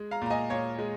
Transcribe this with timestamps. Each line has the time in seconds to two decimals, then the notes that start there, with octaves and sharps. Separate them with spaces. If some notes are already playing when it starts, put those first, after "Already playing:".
Already playing: G#3
0.11 F5 A#5
0.22 A#2 A#5
0.30 D#5 G#5
0.50 A#2 C#5
0.79 G#3